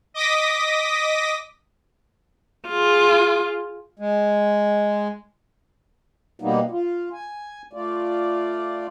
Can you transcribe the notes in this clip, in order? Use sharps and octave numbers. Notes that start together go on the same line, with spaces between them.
D#5 D6 D#6 A#6 B6
F4 G#4
G#3
B2 G3 A#3 B3 D#4
F4
G#5
A3 F4 D5